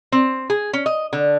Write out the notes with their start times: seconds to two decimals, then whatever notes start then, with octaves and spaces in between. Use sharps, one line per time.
0.12 C4
0.50 G#4
0.73 C#4
0.86 D#5
1.13 D3